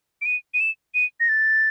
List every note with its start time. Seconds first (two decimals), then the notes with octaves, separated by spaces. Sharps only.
0.22 D7
0.26 D#7
0.54 D#7
0.60 E7
0.94 D#7
1.20 A#6
1.29 A6